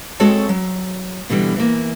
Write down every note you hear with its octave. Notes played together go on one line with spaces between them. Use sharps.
G#3 C4 F#4 A4 C#5 A5
F#3
B2 D3 E3 G3
E3 A#3